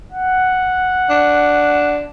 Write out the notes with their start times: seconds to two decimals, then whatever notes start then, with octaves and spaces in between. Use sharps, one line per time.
0.12 F#5
1.10 D4